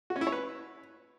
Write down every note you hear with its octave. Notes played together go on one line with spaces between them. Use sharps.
F#4
C#4
E4
C#5
B4